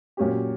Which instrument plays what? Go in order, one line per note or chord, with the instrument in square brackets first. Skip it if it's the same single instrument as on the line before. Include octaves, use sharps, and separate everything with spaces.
[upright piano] A#2 F#3 C#4 G4